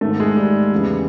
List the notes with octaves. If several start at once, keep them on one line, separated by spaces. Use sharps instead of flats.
G#2 D#3 A3
G#3
G3
E2 C#3 E3